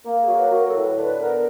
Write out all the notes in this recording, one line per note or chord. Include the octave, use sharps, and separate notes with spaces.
A#3 A#4
G#4
F#3
B4
F#3 A#4
A4
A2
B4
D3 B4
B3 A#4